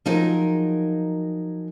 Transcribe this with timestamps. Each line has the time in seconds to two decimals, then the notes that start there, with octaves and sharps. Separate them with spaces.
0.06 F3 F#3 D#4 G#4 A#4